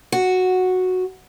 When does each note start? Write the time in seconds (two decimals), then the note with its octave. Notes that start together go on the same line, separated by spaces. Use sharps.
0.12 F#4